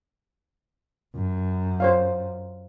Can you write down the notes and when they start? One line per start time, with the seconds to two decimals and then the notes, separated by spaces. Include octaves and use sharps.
1.15 F#2
1.80 C5 C#5 F5